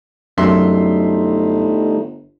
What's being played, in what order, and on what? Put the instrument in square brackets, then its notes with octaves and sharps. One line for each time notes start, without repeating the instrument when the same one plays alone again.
[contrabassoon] G1 [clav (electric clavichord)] F#2 [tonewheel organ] G3 A3 D#4 [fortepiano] E5 C6